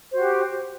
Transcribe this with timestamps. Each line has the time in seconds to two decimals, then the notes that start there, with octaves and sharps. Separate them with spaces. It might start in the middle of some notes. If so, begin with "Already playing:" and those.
0.11 C5
0.15 F#4
0.19 G4